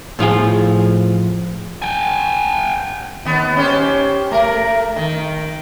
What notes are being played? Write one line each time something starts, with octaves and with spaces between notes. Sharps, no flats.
A2 F3 F4 G#4
G5 G#5
D#2 B3
C#4 G4 C5
A3 A#4
D#3